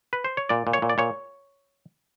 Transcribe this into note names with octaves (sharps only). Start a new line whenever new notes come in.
B4
C5
C#5
A#2 D5
A#2
C#5
A#2
D5
A#2 C#5